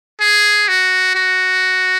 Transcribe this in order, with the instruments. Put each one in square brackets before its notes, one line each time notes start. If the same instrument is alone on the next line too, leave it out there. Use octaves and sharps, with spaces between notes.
[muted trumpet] G#4
F#4
F#4